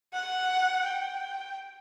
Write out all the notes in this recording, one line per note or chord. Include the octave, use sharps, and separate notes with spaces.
F#5
G5